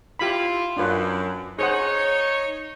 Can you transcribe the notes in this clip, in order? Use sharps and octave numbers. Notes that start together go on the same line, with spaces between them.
E4 F4 G4 B5
F#2 D4 F4 B4
D#4 G#4 C5 C#5 F#5